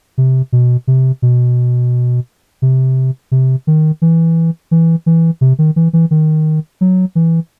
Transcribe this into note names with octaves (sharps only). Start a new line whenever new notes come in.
C3
B2
C3
B2
C3
C3
D#3
E3
E3
E3
C3
D#3
E3
E3
D#3
F#3
E3